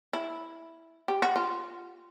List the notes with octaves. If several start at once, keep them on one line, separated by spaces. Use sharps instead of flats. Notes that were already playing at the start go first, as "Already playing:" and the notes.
E4
G4
F#4
F4